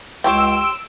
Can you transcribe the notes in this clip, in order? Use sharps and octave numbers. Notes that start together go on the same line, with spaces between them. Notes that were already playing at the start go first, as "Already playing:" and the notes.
C#2 G4 C#5 G5 C6 E6 D7